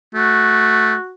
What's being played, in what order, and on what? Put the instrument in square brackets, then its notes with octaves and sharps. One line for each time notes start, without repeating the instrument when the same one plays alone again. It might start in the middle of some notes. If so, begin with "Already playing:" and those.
[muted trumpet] A3 [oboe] F#4